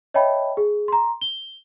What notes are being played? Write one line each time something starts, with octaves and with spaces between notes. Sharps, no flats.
C#5 D#5 E5 G5 A5 B5
G#4
A#5 C6
G7